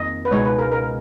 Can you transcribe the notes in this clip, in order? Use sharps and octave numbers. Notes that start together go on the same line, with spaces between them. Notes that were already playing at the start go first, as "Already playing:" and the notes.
Already playing: F2 D#3 A#3 D#5
B4
C#2 B2 G#3 D#4 C#5
B4
A#4
A#4